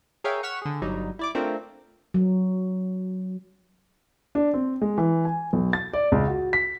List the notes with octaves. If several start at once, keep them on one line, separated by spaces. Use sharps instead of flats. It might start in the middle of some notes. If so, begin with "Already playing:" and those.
G#4 A#4 C#5 E5 F5 G5
F#5 C#6 F6 B6 E7
D3 G#4
G1 F#3 G3 D#4
E4 D5 D6
A3 C4 D4 F4 A#4
F#3
D4
C4
G#3
E3
G#5
B1
A6
D5
C#2
F#4
B6